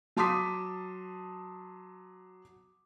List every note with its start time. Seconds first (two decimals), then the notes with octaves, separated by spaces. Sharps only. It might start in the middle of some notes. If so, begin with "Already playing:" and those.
0.16 F#3 A5 C6 D6 D#6 B6